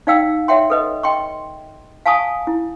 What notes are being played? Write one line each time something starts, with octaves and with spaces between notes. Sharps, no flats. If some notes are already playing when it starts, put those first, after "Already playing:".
D#4 D5 F5 G5 E6
C#5 E5 F#5 G5 C6
A4 B4 D#5
D#5 G5 C6 C#6
F5 G#5 A5 C#6 D#6
E4